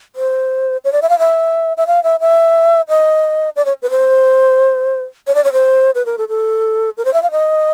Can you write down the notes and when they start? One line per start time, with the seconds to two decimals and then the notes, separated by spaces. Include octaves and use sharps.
0.16 C5
0.84 C#5
0.92 D5
1.02 E5
1.09 F5
1.19 E5
1.77 E5
1.87 F5
2.03 E5
2.20 E5
2.88 D#5
3.56 D5
3.65 C#5
3.82 B4
3.90 C5
5.27 C#5
5.35 D5
5.44 C#5
5.52 C5
5.95 B4
6.06 A#4
6.18 A4
6.29 A4
6.97 A#4
7.05 C5
7.13 E5
7.23 F5
7.31 D#5